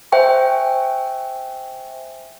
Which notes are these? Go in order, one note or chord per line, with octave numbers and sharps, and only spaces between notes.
C5 E5 G5 G#5 C#6